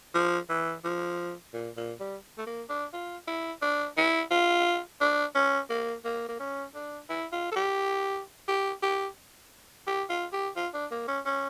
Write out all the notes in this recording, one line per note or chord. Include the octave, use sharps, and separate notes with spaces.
F3
E3
F3
A#2
A#2
G3
A3
A#3
D4
F4
E4
D4
E4
F4
D4
C#4
A#3
A#3
A#3
C#4
D4
E4
F4
A4
G4
G4
G4
G4
F4
G4
F4
D4
A#3
C#4
C#4